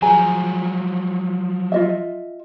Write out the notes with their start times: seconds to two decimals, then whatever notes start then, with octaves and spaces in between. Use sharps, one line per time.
0.02 F3 F#3 G#4 G#5 A#5
1.72 F4 D#5 E5